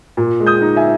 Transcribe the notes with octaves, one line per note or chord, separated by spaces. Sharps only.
A#2
G#3
D#6 G6
D#4
E5 G#5